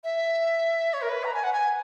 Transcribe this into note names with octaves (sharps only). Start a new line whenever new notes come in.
E5
C#5
A#4
B4
A#5
G#5
F#5
G#5